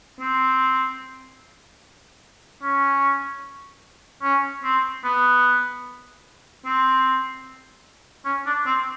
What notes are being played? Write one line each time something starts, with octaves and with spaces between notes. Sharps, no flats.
C4
C#4
C#4
C4
B3
C4
C#4
D4
C4